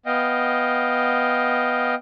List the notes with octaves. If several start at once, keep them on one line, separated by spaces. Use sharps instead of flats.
B3 D#5 F5 G5